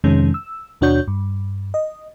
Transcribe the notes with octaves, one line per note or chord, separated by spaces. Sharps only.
F2 C3 D#3 G#3 C#4
E6
D#2 B2 D4 F#4 C#5 G6
G2
D#5